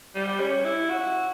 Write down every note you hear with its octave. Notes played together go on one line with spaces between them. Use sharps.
G3
C#4
E4
F#4